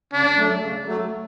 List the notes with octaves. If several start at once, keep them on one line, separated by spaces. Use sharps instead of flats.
C#3 D4
F#3 A3
C#3
F#3 A3